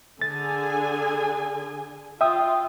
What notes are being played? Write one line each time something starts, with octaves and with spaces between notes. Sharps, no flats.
D3 G#4 G#5 A6
F4 E5 G5 D#6